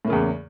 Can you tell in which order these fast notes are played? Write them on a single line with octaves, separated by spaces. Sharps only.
A2 A#3 C#3 E2